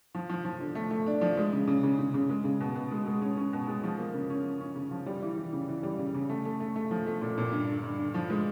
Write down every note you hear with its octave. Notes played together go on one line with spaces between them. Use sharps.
F3
F3
F3
D3
A3
A3
D4
F3
G#3
C#3
C#3
C#3
C#3
C#3
G#3
C#3
B2
B2
G#3
G#3
C#4
C#4
B2
G#3
F3
A#3
C#3
C#4
F3
C#4
C#3
F3
G3
E3
E3
C#3
E3
G3
C#3
C#3
A3
A3
A3
A3
F3
A3
A#2
A#2
G2
D3
G2
D3
F3
G#3